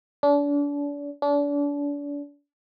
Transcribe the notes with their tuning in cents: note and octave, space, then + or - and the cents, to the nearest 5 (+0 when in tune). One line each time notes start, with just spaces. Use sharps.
D4 -35
D4 -35